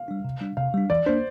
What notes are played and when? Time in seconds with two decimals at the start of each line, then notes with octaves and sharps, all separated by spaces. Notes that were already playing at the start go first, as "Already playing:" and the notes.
Already playing: F5
0.08 G3 D4
0.24 C3
0.41 G3 D4
0.57 C3 F5
0.74 G3 D4
0.90 E3 D5
1.06 A#3 D4 C5